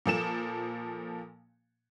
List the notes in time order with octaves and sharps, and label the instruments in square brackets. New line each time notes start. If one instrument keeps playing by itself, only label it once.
[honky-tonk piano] A#2 F3 A4 E7